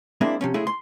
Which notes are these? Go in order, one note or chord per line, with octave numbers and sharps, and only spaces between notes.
G#3 A#3 C4 D4 E4
C3 F3 C#4
C#3 G#3 A3 E4 G#4
C6